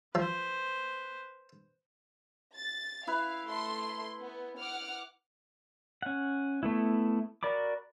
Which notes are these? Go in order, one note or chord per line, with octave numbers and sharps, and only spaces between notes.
F3 B4 C5
A6
E4 B4 F5
A3 C6
B3
F#5 D6 F6
C#4 F#5
A3 B3 E4
F#4 A#4 D5 B5 D6